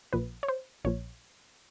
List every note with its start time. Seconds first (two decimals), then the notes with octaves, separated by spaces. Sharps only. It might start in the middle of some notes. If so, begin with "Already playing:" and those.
0.13 A#1 A#2 F3 B4
0.43 C#5
0.48 C5
0.85 A#1 A#2 F3 C#5